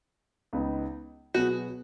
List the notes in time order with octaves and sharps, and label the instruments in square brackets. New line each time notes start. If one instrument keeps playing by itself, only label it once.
[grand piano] C#2 C#3 B3 D#4
[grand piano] B2 F#3 B3 G#4 [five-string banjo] F#4